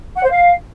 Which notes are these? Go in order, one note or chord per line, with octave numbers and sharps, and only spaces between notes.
F#5
C5
F5